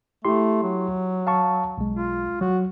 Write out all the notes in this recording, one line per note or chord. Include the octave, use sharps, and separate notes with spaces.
A3 E4 G4 C6
F#3
F5 A5 C#6
B1 G#3
F4
F#3 F#4